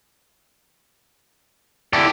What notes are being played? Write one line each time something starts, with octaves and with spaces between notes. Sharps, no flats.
E4 G4 A4 D5